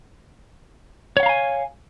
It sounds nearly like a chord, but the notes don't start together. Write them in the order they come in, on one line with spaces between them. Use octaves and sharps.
C#5 F#5 F5 A#5 G#5